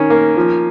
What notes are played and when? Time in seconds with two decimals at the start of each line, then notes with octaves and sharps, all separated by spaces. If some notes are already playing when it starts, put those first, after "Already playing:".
Already playing: D#3 C#4
0.10 A#3
0.37 F3